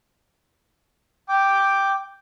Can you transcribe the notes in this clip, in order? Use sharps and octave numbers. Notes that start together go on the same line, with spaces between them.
G5 D6